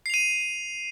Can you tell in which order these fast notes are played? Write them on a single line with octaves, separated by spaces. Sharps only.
C7 F7 D#7